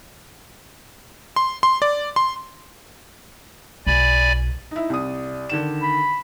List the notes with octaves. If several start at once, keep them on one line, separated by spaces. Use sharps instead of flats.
C6
C6
D5
C6
B1 D5 G#5 B5
D#4 E4
C2 D5 D#6
D3 D#3 E7
B5